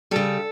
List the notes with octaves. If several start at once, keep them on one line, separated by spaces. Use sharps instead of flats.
C#3 G3 A4